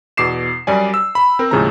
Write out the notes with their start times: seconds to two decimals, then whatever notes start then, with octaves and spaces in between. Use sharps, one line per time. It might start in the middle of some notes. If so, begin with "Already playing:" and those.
0.17 E2 B2 D6 C7 E7
0.67 F#2 G3 D5 G#5
0.94 E6
1.15 B5
1.39 C4 A#4
1.51 D#2 A2 C#3 F3 G#3 A#5